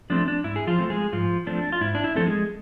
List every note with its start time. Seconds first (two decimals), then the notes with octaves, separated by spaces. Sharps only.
0.10 F3 A3 C4 D4
0.28 D4
0.44 G#2 E4
0.56 G#4
0.67 F3 F4
0.79 F3 A3 C4
0.90 G#3 G#4
1.12 G#2 F3 F4
1.47 F3 A3 C4 D4
1.72 F4
1.81 G#2 E4
1.95 D4
2.04 E4
2.15 F3 A3 C4 A4
2.26 G#3 G#4